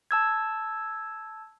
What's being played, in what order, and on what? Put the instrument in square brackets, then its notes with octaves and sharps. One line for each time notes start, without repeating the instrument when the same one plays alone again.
[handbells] A5 E6 G#6